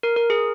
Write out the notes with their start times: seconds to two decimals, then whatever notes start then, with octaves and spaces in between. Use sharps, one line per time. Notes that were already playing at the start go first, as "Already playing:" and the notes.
0.03 A#4
0.16 A#4
0.30 G#4